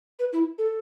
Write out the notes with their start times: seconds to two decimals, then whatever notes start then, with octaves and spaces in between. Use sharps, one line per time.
0.19 B4
0.33 E4
0.58 A4